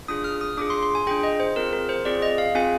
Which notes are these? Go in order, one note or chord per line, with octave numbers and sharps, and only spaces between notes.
D4 F4 G#4 D#6
F6
D#6
D4 F4 G#4 D6
C6
C6
G#5
D4 F4 G#4 G5
D#5
C5
C4 F4 G#4 A#4
A#4
C5
C4 F4 G#4 D5
D#5
F5
C4 F4 G#4 G#5